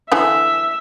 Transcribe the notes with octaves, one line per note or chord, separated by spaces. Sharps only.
D3 E3 A3 E5